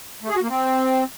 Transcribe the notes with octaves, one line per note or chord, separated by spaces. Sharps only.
A3
G#4
F#4
A#3
C4